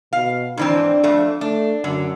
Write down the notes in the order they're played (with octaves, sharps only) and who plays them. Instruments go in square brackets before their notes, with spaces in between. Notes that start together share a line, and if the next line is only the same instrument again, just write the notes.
[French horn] B2 [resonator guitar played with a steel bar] F5
[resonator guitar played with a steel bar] G#2 E3 C4 [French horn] D4
[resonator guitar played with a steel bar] F2 A3
[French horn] A3 [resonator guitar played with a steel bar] D4
[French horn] F#2 [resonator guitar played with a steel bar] D3